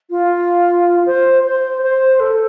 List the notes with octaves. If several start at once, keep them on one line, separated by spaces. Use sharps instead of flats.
F4
C5
C5
C5
A4